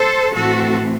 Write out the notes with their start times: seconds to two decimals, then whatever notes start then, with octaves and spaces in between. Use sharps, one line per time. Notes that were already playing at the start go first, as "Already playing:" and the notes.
Already playing: A4 C5
0.34 A2 E3 A3 C4 F#4 A4